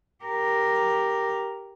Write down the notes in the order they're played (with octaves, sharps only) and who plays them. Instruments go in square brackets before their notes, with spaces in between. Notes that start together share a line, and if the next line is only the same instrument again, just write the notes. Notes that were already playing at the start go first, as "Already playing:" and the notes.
[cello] G4 A#4